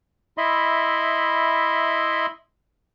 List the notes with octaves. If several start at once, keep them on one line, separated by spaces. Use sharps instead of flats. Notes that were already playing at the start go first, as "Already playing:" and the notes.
E4 D#5 E5 B5 C6